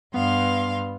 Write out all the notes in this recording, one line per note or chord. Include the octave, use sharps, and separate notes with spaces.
G2 B3 F5 C6